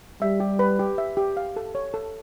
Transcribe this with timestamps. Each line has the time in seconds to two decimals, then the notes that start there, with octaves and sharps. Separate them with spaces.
0.21 G3 E5
0.40 G4
0.59 B4
0.79 G4
0.98 E5
1.17 G4
1.37 F5
1.56 A4
1.75 C#5
1.94 A4